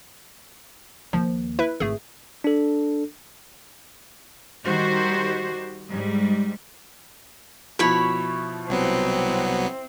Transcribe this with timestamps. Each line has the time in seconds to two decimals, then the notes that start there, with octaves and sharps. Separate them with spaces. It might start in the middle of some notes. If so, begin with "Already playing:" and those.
1.13 D#2 F3
1.59 E4 B4 E5
1.80 G#1 A3 G#4
2.44 D4 A4
4.64 D#3 G3 F#4 G4 C5
5.89 G#2 G3
7.79 B2 F3 E4 C#5 B5
8.69 C2 F#3 B3 C4